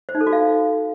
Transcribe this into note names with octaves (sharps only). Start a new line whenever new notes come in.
C5
D#4
A4
F#4
F5